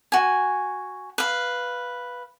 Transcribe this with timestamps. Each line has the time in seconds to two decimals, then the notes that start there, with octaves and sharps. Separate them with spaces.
0.12 F#4 G#5
1.18 B4 F5